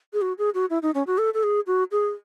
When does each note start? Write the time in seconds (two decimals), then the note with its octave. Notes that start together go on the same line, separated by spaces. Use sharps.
0.13 G#4
0.22 F#4
0.38 G#4
0.54 F#4
0.70 E4
0.82 D#4
0.95 C#4
1.07 F#4
1.18 A4
1.34 A4
1.43 G#4
1.67 F#4
1.91 G#4